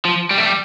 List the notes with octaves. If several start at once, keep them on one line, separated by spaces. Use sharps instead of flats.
F3
G3
A3
G3